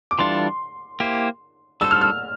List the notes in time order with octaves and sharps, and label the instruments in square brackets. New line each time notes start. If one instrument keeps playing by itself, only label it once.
[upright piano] D6
[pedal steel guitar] E3 G3 D4 F4 A4 [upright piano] C6
[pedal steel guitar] A#3 E4 G4 C5
[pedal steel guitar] G3 D4 A4 C5 [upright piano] E6
[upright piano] F6
F6